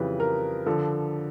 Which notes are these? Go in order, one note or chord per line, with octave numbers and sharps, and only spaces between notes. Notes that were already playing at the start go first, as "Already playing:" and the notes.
Already playing: F2 C#3 E3 G3 B4
A#4
D3 F3 A4